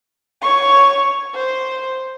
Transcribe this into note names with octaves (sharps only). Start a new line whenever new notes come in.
C#5 C#6
C5